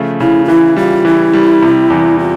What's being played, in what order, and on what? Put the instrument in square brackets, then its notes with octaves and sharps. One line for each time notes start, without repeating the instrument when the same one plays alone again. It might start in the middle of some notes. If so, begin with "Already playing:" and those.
Already playing: [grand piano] C#3 F3 A3
[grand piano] C#3 [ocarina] E4
[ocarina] F4
[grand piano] E3 [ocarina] E4
[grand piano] G3 [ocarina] F4
[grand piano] E3 [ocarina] E4
[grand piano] G3
C3
E2
[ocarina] F4